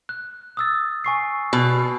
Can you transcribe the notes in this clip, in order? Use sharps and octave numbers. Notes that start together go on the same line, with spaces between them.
F#6
D#6 E6 A6
G#5 C#6 C7
B2